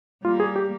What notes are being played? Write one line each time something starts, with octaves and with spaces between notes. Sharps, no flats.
G3 A#3 F4
G#4
G4